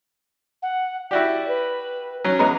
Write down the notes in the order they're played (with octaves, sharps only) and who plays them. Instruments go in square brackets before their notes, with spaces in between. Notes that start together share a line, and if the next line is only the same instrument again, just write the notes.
[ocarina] F#5
[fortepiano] E4 F#4 G4 [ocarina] D5
[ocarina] B4
[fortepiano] F#3 C#4
[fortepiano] E2 G#3 B3 [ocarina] A#5